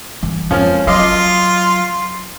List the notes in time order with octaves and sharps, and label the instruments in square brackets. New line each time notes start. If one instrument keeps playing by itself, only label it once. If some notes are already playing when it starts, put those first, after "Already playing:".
[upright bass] E3 G3
[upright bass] F2 G#2 [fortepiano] F3 C#4
[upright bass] F#3 [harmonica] F4 [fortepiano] D#5 F5 D6